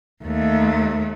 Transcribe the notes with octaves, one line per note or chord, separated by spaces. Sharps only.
D#2 A3